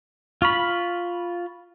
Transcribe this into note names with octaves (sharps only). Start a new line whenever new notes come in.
F4 B5 C#6 F6